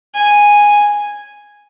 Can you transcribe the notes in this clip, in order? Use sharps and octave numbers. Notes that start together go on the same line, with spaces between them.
G#5